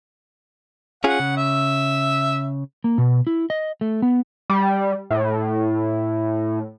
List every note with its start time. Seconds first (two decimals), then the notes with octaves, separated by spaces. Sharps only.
1.04 C#4 F4 G#4 F#5
1.20 C#3
1.37 E5
2.84 A#3
2.98 B2
3.27 E4
3.50 D#5
3.81 A3
4.02 B3
4.50 G3
5.11 A2